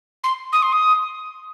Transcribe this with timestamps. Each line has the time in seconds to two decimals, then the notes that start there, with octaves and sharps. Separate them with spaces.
0.24 C6
0.52 D#6
0.62 C6
0.72 D#6